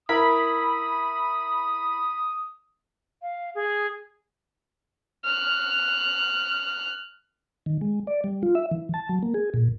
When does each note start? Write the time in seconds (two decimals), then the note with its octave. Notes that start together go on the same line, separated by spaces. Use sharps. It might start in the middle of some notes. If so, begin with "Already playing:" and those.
0.09 E4 A#4 B5 D#6
3.22 F5
3.55 G#4
5.25 F6 F#6
7.66 D#3
7.81 G#3
8.07 D5
8.24 G3
8.43 F4
8.55 E5
8.71 E3
8.94 A5
9.09 F#3
9.23 A#3
9.34 G#4
9.54 A#2